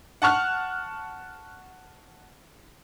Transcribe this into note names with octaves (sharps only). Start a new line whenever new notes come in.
F#5 A5 C#6 F6 F#6